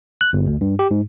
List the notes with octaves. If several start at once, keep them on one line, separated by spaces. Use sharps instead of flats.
F#6
G1
D2
G2
G4
G#2